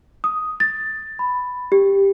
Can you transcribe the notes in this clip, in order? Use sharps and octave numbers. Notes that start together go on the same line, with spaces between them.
D#6
A6
B5
G4